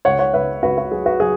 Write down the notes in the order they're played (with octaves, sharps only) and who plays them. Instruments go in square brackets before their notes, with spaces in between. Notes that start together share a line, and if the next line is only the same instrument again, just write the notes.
[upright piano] C#2 C#5 F#5
C#5 F#5
C#2 B4 E5
C#2 F#4 B4
F#4
F#3 G#4
F#4 B4
F#3 G#4